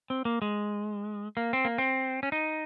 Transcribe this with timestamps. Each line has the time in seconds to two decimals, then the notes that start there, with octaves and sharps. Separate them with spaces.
0.10 C4
0.25 A#3
0.42 G#3
1.37 A#3
1.53 C4
1.65 A#3
1.78 C4
2.23 C#4
2.32 D#4